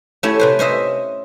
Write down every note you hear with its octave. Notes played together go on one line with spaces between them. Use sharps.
A3 C#4 E4 G4 C#5
C3 B4 C5
C#4 C5 D#5 E5